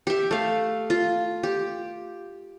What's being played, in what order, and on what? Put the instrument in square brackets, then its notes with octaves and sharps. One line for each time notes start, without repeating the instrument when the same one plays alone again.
[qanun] G4 E5
A3 F5
F4
G4